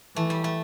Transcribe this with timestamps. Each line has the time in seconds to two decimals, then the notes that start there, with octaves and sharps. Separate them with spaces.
0.15 E3 A3
0.30 G3
0.44 A3